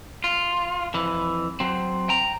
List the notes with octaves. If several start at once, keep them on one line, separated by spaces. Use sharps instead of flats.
F4
F2 E3
F#3 C4
G5 A#5